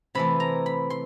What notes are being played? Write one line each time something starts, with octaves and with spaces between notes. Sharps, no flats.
C3 E3 A3 B5
A#5
B5
C6